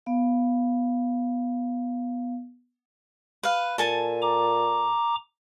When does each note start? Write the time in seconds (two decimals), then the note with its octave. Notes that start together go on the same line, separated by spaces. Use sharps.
0.06 B3 F5
3.43 B4 F5
3.78 A#2 A4 G#5 A5
4.22 A#5 D6